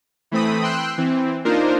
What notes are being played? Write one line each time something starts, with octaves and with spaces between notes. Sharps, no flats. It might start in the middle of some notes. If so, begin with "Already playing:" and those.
E3 A3 C4 B5 D#6
G5 C6 E6 F#6
E3 C4
A#3 D4 D#4 F4 A#4 C5